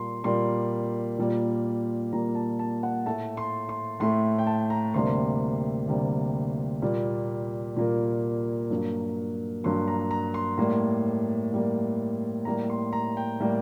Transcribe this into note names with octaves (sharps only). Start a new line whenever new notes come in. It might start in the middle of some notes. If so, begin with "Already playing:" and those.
Already playing: A#2 G3 A#3 A#5 C6
A#2 G3 A#3 C6
A#2 G3 A#3
A#2 G3 A#3 A#5
A5
A5
F#5
A2 A3 A5
C6
C6
A2 A3 C6
G5
A5
A#5
D2 C3 G3 A#3 C6
D2 C3 G3 A#3
A#2 G3 A#3
A#2 G3 A#3
G2 F#3 A#3
G2 F#3 A#3 C6
A#5
A#5
C6
A2 G3 A#3
A2 G3 A#3
A2 G3 A#3 A#5
C6
A#5
G5
A2 G3 A#3